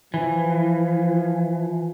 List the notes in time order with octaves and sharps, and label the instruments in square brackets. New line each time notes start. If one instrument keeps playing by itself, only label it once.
[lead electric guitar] E3 [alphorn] F3